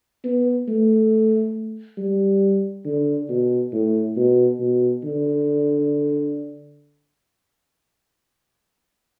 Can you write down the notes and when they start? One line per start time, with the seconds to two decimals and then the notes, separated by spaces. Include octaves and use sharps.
0.24 B3
0.68 A3
1.98 G3
2.85 D3
3.30 B2
3.72 A2
4.17 B2
4.60 B2
5.04 D3